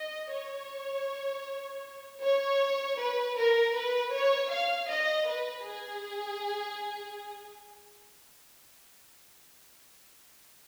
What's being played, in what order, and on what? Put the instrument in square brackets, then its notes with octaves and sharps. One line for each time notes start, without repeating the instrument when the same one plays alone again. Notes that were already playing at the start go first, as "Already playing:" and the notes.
Already playing: [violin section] D#5
C#5
C#5
B4
A#4
B4
C#5
F5
D#5
B4
G#4